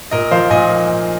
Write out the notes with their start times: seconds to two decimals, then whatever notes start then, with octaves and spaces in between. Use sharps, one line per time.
0.11 A#2 A#4 D#5
0.31 F3 C5 F5
0.50 A#2 D#5 G#5